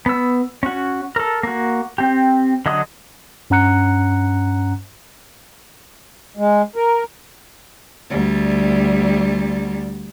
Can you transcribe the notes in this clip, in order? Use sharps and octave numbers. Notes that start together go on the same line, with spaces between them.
B3 E6
C#4 F#4
A4 A#4
A#3 F#4
C4 G4
D3 F#3 D#5 D#6
G2 C#4 F#5 A#5 F#6 C#7
G#3
A#4
D2 G3